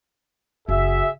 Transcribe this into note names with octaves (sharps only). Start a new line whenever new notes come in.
F#1 F#4 G#4 E5